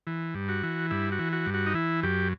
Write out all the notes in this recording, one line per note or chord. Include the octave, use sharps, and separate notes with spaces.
E3
G2
F#4
E3
G2 E4
F#4
E3
F#4
G2
F#4
D#4
E3 E4
F#2 G4